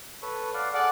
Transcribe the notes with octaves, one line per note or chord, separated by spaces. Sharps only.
A4 B4 C#5
D5 F5 F#5
G#4 A4 D5 F#5